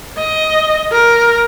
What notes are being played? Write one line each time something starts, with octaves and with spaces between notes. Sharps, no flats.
D#5
A#4